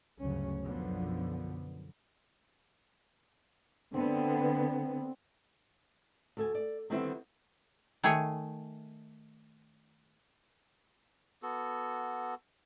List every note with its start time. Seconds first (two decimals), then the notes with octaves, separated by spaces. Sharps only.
0.22 G1 D2 C#3 F#3 C#4
0.64 B1 F#2 D3 F3 B3
3.94 D3 B3 C4
6.37 D2 A4 G#5
6.55 D5
6.90 D3 D#3 G3 B3 C4 E4
8.03 D#3 A3 G#4 C#5
11.42 B3 F#4 A4